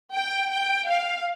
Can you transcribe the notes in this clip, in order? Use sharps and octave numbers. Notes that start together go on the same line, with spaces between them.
G5
G5
F5